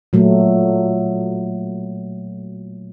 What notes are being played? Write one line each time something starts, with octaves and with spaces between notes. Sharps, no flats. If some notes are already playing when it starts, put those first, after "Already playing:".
A#2 F#3 A3